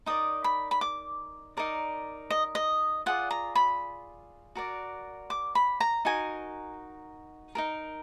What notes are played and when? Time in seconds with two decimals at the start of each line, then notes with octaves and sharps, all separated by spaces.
0.06 D#4 A#4 D5 D#6
0.44 B5
0.71 B5
0.81 D6
1.57 D#4 A#4 D5
2.30 D#5
2.55 D#5
3.06 F4 G#4 D5 F#5
3.31 A#5
3.55 B5
4.55 F#4 A#4 D5
5.30 D6
5.55 B5
5.80 A#5
6.05 D#4 F#4 A#4 G#5
7.55 D#4 F#4 A#4